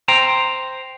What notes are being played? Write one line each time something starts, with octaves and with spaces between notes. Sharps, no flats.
C5 G5 A#5